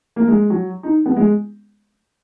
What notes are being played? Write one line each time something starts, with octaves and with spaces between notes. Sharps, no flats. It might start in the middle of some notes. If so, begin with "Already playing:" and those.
A#3
G#3
F#3
D#4
B3
G#3